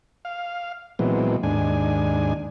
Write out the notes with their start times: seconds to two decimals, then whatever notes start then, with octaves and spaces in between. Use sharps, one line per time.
0.25 F5
0.99 A#2 E3 F#3 G#3 B3 C4
1.43 D#2 G#2 D4 G#5